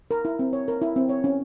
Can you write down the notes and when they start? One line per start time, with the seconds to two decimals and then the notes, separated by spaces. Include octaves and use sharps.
0.11 A#4
0.25 E4
0.39 C4
0.53 C#5
0.68 A#4
0.82 E4
0.96 C4
1.09 C#5
1.24 C#4